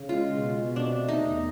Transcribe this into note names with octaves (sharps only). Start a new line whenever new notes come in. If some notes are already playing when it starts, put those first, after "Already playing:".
Already playing: C#3
G#3 F4
B2
B2
C3 D4
A3
D#4
E2